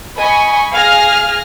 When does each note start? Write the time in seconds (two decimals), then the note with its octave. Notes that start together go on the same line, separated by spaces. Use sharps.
0.19 D#5 G#5 B5 C#6
0.75 G#4 F5 G#5 F6 A#6